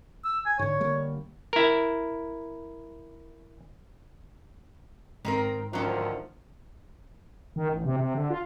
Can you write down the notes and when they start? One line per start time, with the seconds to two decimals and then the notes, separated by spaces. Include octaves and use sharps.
0.24 E6
0.46 G#5
0.59 G#2 D3 C#5
0.80 D3 G3 A#3
1.53 E4 A#4
5.25 G#2 D#3 C4 A#4
5.73 D2 D#3 F3 F#3 C#4
7.56 D#3
7.69 A1
7.85 C3
7.96 C3
8.15 D3
8.30 F4